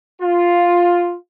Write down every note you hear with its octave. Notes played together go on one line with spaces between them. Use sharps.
F4